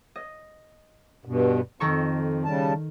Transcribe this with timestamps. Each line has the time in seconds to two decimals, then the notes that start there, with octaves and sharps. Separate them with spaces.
0.16 D#5
1.25 G2 B2
1.80 F2 D#3 A4 C#6
2.45 C#3 G3 A5